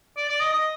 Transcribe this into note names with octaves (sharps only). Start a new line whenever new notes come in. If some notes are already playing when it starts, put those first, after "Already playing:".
D5
D5
D#5
D#5